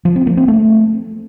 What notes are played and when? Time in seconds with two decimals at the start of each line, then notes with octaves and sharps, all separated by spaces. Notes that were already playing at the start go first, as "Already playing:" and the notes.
0.05 F3
0.16 C4
0.27 A#3
0.37 C4
0.48 A3